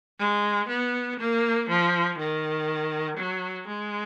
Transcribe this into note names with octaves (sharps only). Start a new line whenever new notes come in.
G#3
B3
A#3
F3
D#3
F#3
G#3